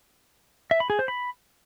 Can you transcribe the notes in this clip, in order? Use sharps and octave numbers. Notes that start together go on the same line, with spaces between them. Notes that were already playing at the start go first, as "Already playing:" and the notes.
E5
B5
G#4
C5
B5